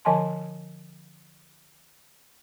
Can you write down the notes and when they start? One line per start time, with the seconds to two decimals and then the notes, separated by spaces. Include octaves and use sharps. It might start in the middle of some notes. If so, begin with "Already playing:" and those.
0.05 D3 F3 D#5 G#5 A5 C6